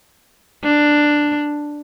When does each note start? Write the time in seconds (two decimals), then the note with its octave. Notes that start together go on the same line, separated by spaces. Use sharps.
0.63 D4